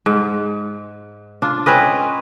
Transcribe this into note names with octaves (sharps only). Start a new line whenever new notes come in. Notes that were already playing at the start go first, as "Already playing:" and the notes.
G#2
D4 F4
C4 C#4 B4 D#5